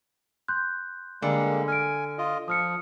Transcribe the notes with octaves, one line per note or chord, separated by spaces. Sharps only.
C6 F#6 G6
D3 G3 G#3 A#3
G#5 F6 D7
F4 D#5
F3 D#6 F6 C#7